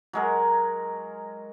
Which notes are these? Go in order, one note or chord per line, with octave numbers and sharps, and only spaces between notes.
F#3 G#3 A#4